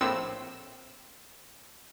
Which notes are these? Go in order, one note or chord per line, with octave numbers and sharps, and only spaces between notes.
A#1 A2 C4 E6